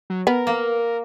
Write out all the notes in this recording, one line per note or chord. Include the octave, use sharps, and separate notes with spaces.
F#3
B3 A#4
A#3